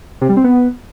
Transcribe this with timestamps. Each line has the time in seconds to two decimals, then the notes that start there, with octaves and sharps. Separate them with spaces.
0.21 C3
0.29 G3
0.37 C4
0.44 B3